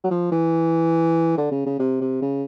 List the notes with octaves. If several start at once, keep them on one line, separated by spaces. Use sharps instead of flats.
F#3
F3
E3
D3
C#3
C#3
C3
C3
C#3